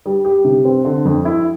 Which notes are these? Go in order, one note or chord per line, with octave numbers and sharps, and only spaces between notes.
G3
G4
C3
C4
D3
F2
E4